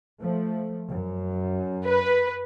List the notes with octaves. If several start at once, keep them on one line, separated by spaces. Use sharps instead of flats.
F3 A3
F#2
B4